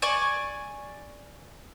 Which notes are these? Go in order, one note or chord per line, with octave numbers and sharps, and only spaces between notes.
D5 G#5 C#6